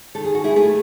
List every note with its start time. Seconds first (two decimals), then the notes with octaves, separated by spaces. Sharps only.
0.15 D#3 A4
0.25 G#4
0.35 F#4
0.44 E4 G#4
0.56 A3 G#4 B4